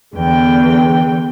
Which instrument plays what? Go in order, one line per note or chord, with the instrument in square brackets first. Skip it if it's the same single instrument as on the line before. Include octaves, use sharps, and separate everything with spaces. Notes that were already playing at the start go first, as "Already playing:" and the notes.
[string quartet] E2 D3 G5